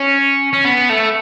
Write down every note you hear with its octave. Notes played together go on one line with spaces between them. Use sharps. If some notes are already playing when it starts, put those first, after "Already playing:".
Already playing: C#4
C#4
B3
A3